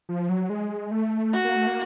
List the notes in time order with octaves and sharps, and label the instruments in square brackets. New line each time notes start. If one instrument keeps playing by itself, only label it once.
[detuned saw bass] F3
F#3
G#3
A3
[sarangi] F#4
[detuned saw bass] A#3
A3
A#3